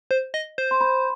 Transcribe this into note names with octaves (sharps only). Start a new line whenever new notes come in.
C5
D#5
C5
C6
B5